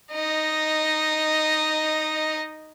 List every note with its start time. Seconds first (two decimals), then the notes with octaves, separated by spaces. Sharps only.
0.12 D#4 D#5